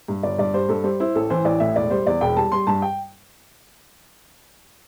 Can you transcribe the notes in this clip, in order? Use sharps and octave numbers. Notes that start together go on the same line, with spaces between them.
G2
G1 D5
G2 D5
G3 C5
G2 A4
G3 C5
E4 C5
A1 A4
E3 C5
A1 D5
A2 E5
E1 D5
G3 C5
E2 D5
E1 G5
G3 A5
G3 C6
G2 A5
G5